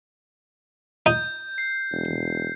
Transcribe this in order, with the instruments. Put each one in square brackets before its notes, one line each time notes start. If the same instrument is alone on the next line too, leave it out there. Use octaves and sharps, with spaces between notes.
[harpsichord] D#4 [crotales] G6
[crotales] C7
[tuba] E1